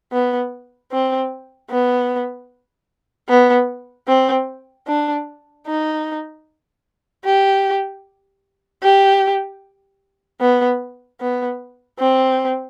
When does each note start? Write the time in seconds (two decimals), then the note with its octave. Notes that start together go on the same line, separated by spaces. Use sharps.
0.12 B3
0.92 C4
1.70 B3
3.29 B3
4.07 C4
4.87 D4
5.67 D#4
7.25 G4
8.83 G4
10.41 B3
11.21 B3
11.99 C4